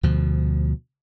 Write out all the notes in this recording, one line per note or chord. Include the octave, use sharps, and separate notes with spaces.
D2 B2 F3